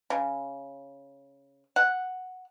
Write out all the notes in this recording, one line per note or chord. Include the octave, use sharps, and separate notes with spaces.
C#3
F#5